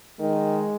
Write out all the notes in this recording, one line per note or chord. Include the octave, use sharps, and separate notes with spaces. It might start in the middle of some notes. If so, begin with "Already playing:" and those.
D#3 G#3